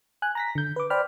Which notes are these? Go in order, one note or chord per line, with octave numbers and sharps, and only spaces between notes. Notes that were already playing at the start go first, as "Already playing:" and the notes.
G#5 F#6
A#5 A#6 B6
D3 G6
B4 D6
C5 D5 G5 B5 F6